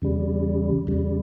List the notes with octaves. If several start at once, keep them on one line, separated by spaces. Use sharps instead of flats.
E2 C#3 G3
E2 C#3 G3